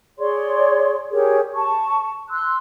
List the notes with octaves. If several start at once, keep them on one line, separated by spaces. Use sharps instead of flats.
G#4 C#5 D5 C6
G4 G#4 A#4 C#5
A5 C#6
C6 E6 F#6